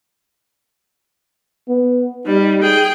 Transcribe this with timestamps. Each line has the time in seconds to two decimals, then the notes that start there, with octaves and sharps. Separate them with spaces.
1.69 B3
2.27 G3 D#4
2.63 G#4 G5